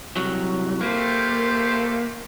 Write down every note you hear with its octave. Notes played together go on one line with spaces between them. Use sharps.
C2 F#3
G3 A3 A#3 C5